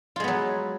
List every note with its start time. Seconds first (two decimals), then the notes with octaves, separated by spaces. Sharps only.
0.16 F4
0.20 G#3
0.24 B3
0.28 F#3